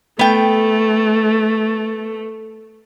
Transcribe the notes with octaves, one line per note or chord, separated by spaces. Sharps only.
A3 B3 G5